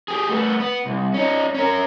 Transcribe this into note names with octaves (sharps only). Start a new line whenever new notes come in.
G4 G#4
A3 B3
B3
C2
C#4 D#4
C#4 A#4